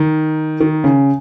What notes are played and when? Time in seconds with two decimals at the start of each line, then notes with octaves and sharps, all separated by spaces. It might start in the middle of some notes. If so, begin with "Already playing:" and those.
Already playing: D#3
0.60 D#3
0.84 C#3